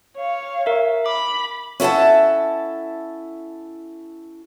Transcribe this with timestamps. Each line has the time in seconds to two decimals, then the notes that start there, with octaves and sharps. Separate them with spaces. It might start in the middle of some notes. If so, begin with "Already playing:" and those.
0.17 C#5 F5
0.66 A#4 E5
1.06 B5 D6
1.80 C#4 E4 A4 F#5 A5